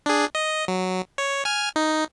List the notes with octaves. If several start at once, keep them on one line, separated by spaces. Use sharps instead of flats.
D4 G#4
D#5
F#3
C#5
G#5 F6
D#4